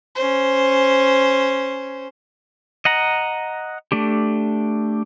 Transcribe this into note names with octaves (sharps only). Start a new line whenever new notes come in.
C#4 C5
D#5 F#5 A#5
A3 D4 G4